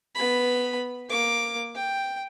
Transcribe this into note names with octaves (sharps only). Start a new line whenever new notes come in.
B3 B5
A#3 D6
G5